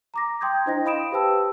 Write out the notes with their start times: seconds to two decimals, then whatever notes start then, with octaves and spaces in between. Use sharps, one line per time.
0.14 A#5 D6 A#6
0.41 G5 C6 D#6 G6 G#6
0.66 D4 E4 C5 D#5 G5 A#6
0.85 F5 B5 D#6 D7 E7
1.12 G4 B4 C5 G5 A5 E6